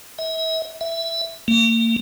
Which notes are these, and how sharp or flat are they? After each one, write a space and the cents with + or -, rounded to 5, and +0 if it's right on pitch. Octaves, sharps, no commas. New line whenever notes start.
E5 -40
E5 +5
A#3 -35